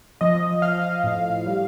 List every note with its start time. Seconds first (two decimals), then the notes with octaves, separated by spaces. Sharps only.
0.21 F3 D#5
0.62 F3 F5
1.04 A2
1.46 G3